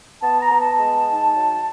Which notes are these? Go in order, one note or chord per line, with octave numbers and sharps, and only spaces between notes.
B3 A5
A#5
B3
A5
G#3
D#4
F#3